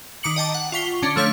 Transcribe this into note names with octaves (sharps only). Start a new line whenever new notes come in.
D#3 A#5 D6 C#7 F#7
D#5 G5 A5 D6
F#5
F4 C#6 B6 G7
D3 C#4 D4
F3 A3 C#5 F5 G6 B6